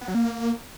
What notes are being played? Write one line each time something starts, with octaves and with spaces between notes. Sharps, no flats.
B3
F#3
A#3